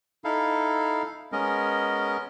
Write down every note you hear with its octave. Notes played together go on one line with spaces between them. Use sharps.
D#4 E4 A4 F5
G#3 B3 C#4 A#4 D#5